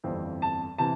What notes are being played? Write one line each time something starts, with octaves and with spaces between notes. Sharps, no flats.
G1 F2 E3 G3 C4
A5
C3 E3 A5